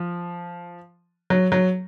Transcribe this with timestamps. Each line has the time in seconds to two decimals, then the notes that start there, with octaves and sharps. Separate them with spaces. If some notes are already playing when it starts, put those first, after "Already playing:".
Already playing: F3
1.30 F#3
1.52 F#3